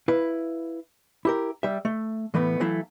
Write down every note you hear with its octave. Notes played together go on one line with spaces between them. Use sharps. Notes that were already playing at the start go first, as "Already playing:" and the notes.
E4 B4 F5
E4 G4 A#4
G3 E5
A3
A2 E3 A3 B3
E3 F#3 A3 E4 F5